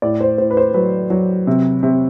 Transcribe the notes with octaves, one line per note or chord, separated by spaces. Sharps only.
A2 D5
C5
A2 C5
B4
C5
F#3 B4
F#3
C3
C3